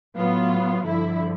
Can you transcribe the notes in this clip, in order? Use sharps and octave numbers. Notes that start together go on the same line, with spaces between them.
A2 F#3 B3 F4
G2 D3 F3 E4